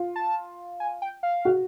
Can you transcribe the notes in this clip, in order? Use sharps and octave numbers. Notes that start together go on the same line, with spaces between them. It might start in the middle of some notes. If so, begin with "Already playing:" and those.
Already playing: F4
A5
G#5
G5
F5
F#4